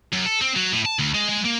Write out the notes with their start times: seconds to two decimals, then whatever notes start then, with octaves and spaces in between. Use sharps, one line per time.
0.12 F#2
0.25 A4
0.41 C4
0.56 F#3
0.72 A2
0.85 A5
0.99 D2
1.14 G#3
1.29 G#3
1.45 A#3